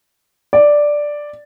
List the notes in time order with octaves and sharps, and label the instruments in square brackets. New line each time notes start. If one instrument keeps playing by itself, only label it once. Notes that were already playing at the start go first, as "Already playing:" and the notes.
[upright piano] D5